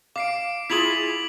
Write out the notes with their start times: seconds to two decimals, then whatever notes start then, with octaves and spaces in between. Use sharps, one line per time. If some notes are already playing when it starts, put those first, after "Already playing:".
0.16 F5 D6 C7 D7
0.70 E4 F4 G#4 B6 F7 F#7